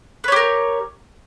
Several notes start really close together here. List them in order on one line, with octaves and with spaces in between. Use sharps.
B4 C#5 G4 A#4